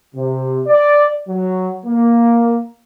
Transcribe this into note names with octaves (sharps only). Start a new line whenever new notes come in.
C3
D5
F#3
A#3